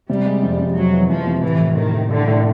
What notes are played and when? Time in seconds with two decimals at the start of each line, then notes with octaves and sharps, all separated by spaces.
0.08 C3 G3
0.26 G#3
0.43 F2
0.59 F2
0.76 F2 F#3
0.93 E3
1.10 F2 F3
1.27 C3
1.43 A2 E3
1.60 A2
1.77 A2 D#3
1.94 A2
2.10 A2 D3
2.28 A2